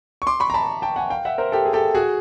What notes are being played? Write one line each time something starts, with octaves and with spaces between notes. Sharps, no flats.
C#6
C6 D6
B5 C#6
A#5
A5 B5
G5 A5
F#5 G#5
F5 G5
E5 F#5
A#4 C5
G4 A4
G#4
G4 A4
F#4 G#4